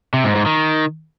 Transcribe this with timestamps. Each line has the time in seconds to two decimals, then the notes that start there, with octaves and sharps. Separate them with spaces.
0.14 C3
0.24 G#2
0.35 G#2
0.46 D#3